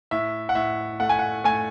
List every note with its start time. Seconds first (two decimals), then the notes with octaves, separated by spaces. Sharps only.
0.11 A2 E5
0.49 F#5
0.55 A2 E5
1.00 A3 F#5
1.09 G#5
1.19 F#5
1.44 A3 G#5